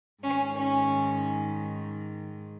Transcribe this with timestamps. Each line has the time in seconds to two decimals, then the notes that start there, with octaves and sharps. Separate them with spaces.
0.23 G#2 D#3 C#4
0.58 C#4